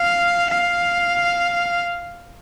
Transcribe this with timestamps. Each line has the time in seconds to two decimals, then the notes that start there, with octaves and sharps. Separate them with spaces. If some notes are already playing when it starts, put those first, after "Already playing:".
Already playing: F5
0.51 F5